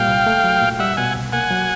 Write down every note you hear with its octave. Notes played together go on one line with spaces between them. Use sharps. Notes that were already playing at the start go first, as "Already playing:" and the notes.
Already playing: A#2 G3 F5 G5
C2
A3
F#3
A#2
G3 E5 F#5
B2 F#5 G#5
C2
A#3 F#5 G#5
F#3